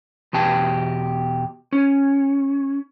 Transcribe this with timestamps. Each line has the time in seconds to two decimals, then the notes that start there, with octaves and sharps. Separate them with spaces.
0.33 E2 B2 G4 A5
1.73 C#4